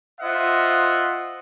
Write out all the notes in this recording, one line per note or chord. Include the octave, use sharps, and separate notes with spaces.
F4 C5 D#5 E5 F#5